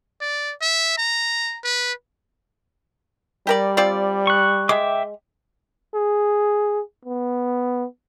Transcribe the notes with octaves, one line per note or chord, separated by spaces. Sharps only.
D5
E5
A#5
B4
G3 G4 A#4 D5
C4 F4 D5
C#6 F#6
G#3 E5 G5 D6
G#4
B3